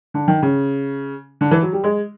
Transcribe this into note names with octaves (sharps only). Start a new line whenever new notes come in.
D3
D#3
C#3
D3
E3
F#3
G3
G#3